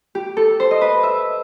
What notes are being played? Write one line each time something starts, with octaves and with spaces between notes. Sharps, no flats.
G4
A4
C5
D#5
B4
E5